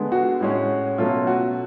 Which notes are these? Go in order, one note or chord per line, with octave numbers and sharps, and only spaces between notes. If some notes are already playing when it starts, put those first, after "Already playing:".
Already playing: D3 G#3 B3
F#4
A2 G#3 C#4
B2 F#3 A3 C#4 F4
F#4